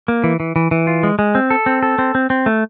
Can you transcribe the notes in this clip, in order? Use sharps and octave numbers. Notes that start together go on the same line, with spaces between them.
A#3
E3
E3
E3
E3
F4
G#3
G#3
C4
A4
C4
A4
C4
C4
C4
A3